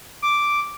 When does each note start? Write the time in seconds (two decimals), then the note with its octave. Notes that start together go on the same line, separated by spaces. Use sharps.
0.22 D6